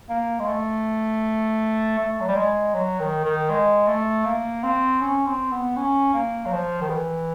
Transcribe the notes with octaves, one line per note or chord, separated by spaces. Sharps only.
A#3
G#3
A3
A3
F#3
G3
G#3
F#3
D#3
D#3
G#3
A3
A#3
C4
C#4
C4
B3
C#4
A#3
F#3
F3
D#3
E3